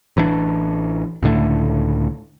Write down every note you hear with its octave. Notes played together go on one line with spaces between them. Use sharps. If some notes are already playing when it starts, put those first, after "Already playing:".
A1 E3 G3 D4
C#2 A2 D3 A3